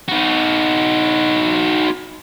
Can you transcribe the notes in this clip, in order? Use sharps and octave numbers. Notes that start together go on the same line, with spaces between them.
D#4 F#4